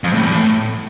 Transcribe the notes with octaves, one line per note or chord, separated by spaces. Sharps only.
F2
A2
E2
A2